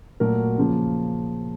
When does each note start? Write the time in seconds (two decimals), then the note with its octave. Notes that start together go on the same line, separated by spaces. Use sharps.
0.20 A#2 F#3 A3 F#4 A#4
0.58 C#3 F3 A#3